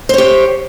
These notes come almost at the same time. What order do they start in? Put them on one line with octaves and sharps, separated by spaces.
C5 C#5 G4